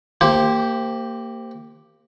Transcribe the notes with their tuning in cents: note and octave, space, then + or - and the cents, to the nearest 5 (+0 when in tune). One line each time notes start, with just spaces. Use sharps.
A#3 -25 G4 +0 C5 +0